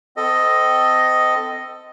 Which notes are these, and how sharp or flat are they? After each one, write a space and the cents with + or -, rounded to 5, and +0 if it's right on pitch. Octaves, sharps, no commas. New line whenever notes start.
C4 -25 A4 +10 D#5 +0